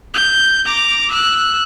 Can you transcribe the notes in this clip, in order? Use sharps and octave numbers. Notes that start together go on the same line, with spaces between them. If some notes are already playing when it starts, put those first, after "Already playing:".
G6
A#5 D6
E6 F#6